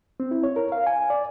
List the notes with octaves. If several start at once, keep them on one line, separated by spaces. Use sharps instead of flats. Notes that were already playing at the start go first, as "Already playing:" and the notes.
C4
E4
C#5
A#4
F5
G#5
D5